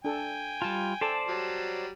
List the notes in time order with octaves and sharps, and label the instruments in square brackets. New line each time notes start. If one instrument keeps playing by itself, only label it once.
[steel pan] D4 A4 [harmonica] G5 G#5
[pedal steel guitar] G3 F4 [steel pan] A5
[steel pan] A4 [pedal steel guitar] C5 D5 A5
[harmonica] F#3 G3